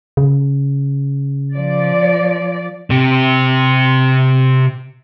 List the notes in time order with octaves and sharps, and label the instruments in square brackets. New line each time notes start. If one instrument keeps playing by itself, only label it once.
[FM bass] C#3
[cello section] F3 D5
[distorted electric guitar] C3 G4